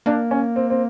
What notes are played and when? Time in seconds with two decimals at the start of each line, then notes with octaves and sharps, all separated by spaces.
0.06 A#3 D4
0.31 C#4
0.56 C4
0.70 C4